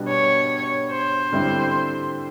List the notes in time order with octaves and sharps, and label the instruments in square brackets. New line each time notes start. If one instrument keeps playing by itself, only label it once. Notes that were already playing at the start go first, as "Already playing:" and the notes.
Already playing: [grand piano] B2 G3 B3 D4
[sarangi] C#5
C5
[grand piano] D3 G3 C4 E4